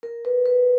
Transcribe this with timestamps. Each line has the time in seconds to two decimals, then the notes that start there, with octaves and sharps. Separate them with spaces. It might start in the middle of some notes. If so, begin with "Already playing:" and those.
0.03 A#4
0.25 B4
0.46 B4